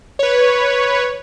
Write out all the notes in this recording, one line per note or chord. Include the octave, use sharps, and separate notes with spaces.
B4 C#5